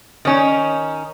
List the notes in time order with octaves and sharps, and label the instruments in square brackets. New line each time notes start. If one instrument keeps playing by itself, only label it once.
[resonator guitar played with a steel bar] D#3 C#4 D#4